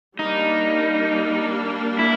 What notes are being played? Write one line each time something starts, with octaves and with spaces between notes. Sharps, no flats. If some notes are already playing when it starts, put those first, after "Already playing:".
G3 A#3 D4 D#4
E4